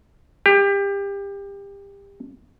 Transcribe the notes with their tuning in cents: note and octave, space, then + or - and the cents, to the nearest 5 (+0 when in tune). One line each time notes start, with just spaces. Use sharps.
G4 +25